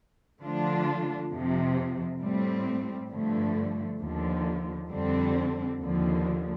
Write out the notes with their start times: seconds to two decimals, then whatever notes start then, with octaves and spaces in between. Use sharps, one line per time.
0.41 D3 F3 A3 D4 F4
1.32 F2 C3 F3
2.21 A2 G3 C4
3.10 G2 D3 F3 A3
4.01 D#2 D3 F3
4.90 F2 D3 G3 C4
5.80 D#2 D3 F3